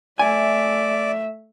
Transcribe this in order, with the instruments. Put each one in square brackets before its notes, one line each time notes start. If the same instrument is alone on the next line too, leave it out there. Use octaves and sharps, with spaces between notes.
[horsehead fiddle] A3 E5 [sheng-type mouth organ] D5 [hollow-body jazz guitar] G#5